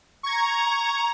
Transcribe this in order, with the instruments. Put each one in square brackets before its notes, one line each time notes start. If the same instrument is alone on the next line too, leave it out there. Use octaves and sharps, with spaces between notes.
[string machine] A#5 [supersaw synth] C#6 G#6